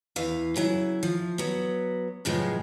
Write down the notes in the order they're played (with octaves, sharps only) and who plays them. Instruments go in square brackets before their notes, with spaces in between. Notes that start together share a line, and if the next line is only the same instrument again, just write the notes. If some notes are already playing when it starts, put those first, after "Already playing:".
[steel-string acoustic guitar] E2 E3 F5
C#3 F#3 E4
F3
F#3 B3
F#2 A2 C#3 E3 F3 G#3